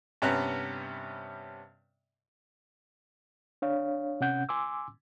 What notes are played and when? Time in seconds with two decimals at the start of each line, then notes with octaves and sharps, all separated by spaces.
0.22 G2 C3 B3 C#4 A#5 F#6
3.62 D4 C#5 F5
4.21 C3 C#4 F#5 G6
4.49 G#5 C6 D6 E6